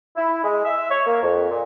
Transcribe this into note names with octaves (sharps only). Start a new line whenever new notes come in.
E4
G#3
E5
C#5
A#3
F2
A#2